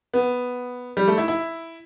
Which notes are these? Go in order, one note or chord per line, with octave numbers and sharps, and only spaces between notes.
B3
G3
A3
E4
E4